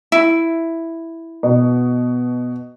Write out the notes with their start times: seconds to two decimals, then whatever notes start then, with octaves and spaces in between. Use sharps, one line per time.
0.12 E4
1.43 B2